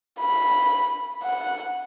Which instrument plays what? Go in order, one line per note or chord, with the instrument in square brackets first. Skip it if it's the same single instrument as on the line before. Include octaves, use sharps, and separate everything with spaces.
[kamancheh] B5
F#5